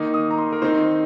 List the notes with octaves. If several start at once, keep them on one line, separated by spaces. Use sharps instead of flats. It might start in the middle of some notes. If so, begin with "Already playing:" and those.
Already playing: D#3 A#3 D#4
D#6
A#5
C6
A#4
D#3 C4 D#4 C5